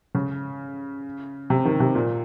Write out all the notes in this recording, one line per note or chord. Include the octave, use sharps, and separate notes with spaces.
C#3
C3
D#3
C3
A#2